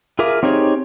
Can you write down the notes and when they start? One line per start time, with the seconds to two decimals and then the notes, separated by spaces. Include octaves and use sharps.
0.19 F4 G#4 A#4 E5 D6
0.43 C4 D#4 G4 G#4 C#5